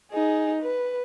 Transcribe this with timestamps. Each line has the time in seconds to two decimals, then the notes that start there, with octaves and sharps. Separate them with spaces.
0.11 D#4 G#4
0.62 B4